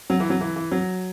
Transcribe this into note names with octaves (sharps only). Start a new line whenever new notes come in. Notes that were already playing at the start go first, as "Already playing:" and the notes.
F#3
E3
F#3
E3
E3
F#3